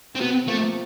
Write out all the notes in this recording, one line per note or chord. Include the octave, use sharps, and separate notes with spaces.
C4
C3 B3
F3 A3 A#3